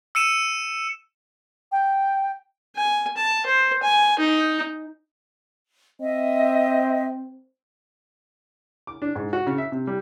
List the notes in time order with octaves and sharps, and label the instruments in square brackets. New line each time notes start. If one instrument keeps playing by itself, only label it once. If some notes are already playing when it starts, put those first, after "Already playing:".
[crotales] E6 C#7 D#7 E7
[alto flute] G5
[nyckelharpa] G#5
A5
C5
G#5
D#4
[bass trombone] C4 [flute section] D#5 E5
[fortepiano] D6
D4
G#2
F#4
C#3
E5
C3
G3